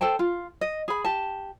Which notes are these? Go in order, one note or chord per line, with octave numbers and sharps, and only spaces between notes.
A4 C5 G5 A5
F4
D#5
G#4 B5
G4 A5